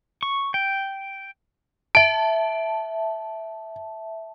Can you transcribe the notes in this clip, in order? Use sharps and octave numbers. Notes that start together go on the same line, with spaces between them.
C#6
G5
E5 A5 D7